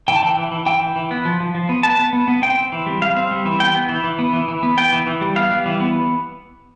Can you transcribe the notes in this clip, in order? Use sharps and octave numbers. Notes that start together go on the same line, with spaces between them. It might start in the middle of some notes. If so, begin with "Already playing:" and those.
E3 G5
A5
E3 G5
E3
E3
E3 G5
E3
E3
B3
F3
F3
F3
B3
B3 A5
B3
B3
B3
C4 G5
C4
E3
G3
G3 F5
C4
G3
E3
B3 G5
B3
E3
E3
B3
E3
E3
B3
B3 G5
E3
E3
G3
B3 F5
G3
E3
B3